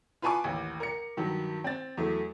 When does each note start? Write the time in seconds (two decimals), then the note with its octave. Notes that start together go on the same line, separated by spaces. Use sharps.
0.22 F4 B4 G#5 A5 C#6 D6
0.44 A1 D#2
0.80 A#4 C#7
1.17 G2 D#3 F#3
1.64 C4 A6
1.97 E2 F#3 A3